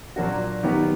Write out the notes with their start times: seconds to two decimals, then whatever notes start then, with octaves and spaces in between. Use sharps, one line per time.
0.16 A#2 F#3 A#3 D4 F#4
0.63 D#3 F#3 B3 D#4 G4